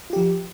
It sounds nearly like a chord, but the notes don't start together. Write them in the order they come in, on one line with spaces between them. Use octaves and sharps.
F4 G4 F3